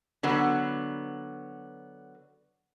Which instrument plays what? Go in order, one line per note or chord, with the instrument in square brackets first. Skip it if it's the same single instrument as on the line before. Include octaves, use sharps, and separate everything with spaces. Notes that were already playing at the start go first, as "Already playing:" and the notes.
[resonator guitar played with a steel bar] D3 F#3 B3